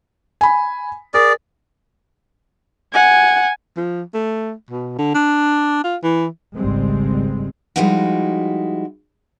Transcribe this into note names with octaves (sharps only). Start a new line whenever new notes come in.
G#5 B5
G#4 A#4 D5
F#5 G#5
F3
A3
B2
D3
D4
F4
E3
G#1 C#2 G3 G#3 C4
F3 G3 G#3 D#4 E4 F#4